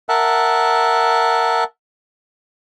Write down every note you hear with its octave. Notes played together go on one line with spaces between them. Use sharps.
A#4 E5 F#5 A5